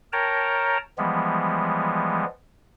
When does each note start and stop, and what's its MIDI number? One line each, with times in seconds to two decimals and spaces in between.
0.13 0.78 70
0.13 0.78 73
0.13 0.78 79
0.13 0.78 81
0.13 0.78 82
0.98 2.25 52
0.98 2.25 53
0.98 2.25 55
0.98 2.25 56
0.98 2.25 59